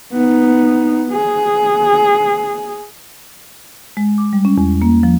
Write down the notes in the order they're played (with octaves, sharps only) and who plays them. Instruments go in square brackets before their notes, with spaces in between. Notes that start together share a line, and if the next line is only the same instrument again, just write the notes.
[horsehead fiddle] B3 D#4
G#4
[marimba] G#3
D6
G3
C#4
E2
A#3
F3